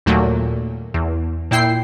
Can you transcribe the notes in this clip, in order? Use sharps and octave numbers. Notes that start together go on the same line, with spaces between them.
D#2 A#2 F#3 A3 A#3
E2
A#2 E4 G5 C7